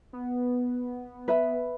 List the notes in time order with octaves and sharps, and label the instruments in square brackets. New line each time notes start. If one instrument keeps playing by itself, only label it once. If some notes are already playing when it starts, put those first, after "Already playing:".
[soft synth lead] B3
[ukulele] B4 E5 B5